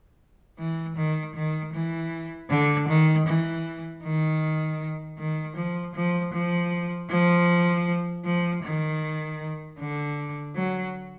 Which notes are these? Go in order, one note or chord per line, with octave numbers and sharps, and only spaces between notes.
E3
D#3
D#3
E3
D3
D#3
E3
D#3
D#3
F3
F3
F3
F3
F3
D#3
D3
F#3